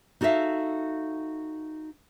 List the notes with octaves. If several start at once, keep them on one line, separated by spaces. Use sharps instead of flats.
D#4 F#4 A4 D5 E5 F5